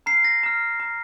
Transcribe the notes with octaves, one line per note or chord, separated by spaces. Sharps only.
A#5 F6 C7
A#6
A#5 F6
A#5 F6